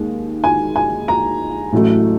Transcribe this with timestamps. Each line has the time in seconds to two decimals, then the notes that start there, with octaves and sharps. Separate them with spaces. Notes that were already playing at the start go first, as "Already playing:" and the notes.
Already playing: D#2 D#3 G#3
0.44 G#5
0.76 G#5
1.08 A#5
1.73 A1 A2 F#3 A3